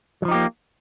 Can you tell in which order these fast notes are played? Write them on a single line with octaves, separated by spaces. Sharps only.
F#3 F3 D#4 G4 A#3